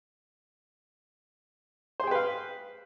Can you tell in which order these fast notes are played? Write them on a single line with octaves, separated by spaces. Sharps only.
C5 G#4 G5 B4 F5